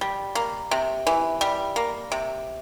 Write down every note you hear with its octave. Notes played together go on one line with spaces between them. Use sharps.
G3
A#3
C3
E3
G3
A#3
C3